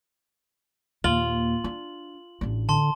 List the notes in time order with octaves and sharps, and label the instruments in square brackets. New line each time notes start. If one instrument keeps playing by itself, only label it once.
[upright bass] D#2 A#2 [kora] F4 [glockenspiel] F#7
[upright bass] D4
A1 D4
[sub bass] D3 [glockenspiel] A5 C6